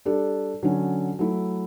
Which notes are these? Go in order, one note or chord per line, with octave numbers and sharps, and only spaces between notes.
G3 D4 A4
D3 F#3 C#4
F#3 A3 E4